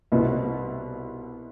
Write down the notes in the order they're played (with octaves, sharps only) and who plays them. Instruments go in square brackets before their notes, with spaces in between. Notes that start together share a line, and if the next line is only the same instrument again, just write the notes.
[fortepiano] C2 B2 G3 B3 E4